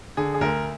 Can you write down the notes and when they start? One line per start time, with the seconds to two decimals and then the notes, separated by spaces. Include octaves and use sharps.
0.17 D3 G#4
0.34 G#4
0.41 D2 A#4